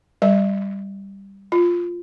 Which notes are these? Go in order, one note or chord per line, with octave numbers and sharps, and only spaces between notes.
G3 E5
F4